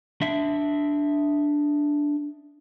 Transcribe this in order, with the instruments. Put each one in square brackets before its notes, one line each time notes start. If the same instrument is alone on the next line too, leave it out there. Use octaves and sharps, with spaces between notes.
[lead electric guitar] D4 E5